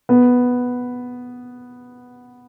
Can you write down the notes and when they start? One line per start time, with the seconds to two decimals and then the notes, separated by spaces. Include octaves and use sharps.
0.09 B3